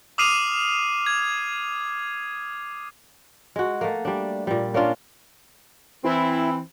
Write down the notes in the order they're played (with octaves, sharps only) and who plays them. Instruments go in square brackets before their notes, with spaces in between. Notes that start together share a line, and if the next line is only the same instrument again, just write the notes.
[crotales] D6 D#6 F6 C7 D#7 F7
G#6
[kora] G#3 F#4
A3 A#3
G3 D4
A#2 G3
A#3 C#4 D4 F4
[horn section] E3 C4 [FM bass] E4